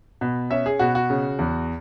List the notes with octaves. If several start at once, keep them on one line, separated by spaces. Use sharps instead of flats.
B2
C#4 E5
G#4
B2 F#4
F#4
C#3
E2